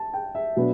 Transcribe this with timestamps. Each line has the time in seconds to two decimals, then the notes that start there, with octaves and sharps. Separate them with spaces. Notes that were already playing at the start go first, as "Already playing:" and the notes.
Already playing: A5
0.14 G5
0.35 E5
0.56 B2 F#3 B3 D4